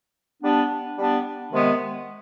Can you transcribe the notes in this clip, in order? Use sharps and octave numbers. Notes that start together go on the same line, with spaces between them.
G3 B3 D4
G3 B3 D4
C3 D#3 G#3 B3